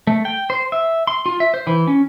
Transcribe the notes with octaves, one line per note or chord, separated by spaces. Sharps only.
A3
G5
C5
E5
C6
F4
E5
C5
E3
C#4